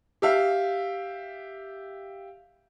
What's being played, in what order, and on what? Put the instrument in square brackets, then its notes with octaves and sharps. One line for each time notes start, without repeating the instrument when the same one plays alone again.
[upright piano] G4 E5 F5